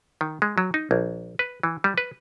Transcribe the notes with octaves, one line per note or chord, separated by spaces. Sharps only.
D#3
G#3
F#3
D#4
A#1
B4
E3
G3
B4